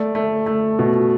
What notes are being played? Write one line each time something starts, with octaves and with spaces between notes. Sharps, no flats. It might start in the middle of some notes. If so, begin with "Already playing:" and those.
Already playing: A3 D5
A3
A3
B2